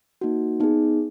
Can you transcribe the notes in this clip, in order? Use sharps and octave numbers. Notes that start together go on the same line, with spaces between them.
A#3 D#4 F#4
B3 D#4 G#4